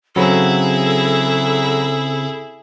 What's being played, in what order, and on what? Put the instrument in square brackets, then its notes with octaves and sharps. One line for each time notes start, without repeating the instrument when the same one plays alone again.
[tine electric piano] C#3 C4 [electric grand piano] F#3 B5 [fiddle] E4 G#4 [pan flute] A4